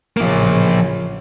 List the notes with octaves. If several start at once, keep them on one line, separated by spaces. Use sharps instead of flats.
A1 C#3 F3 A#3